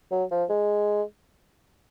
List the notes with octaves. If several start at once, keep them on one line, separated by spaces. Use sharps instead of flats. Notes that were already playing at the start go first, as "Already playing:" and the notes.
F#3
F3
G#3